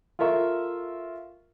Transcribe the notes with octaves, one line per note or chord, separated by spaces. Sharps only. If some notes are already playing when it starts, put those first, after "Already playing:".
F4 A4 A#4 E5 C#6